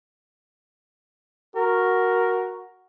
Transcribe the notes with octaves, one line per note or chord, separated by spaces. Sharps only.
F#4 A#4